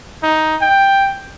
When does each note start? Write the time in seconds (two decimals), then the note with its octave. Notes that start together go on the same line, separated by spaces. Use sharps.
0.23 D#4
0.61 G5